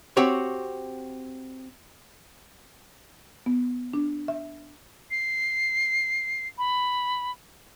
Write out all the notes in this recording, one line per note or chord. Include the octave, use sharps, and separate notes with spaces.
C4 F#4 G4 C#5
B3
D4
E5
C7
B5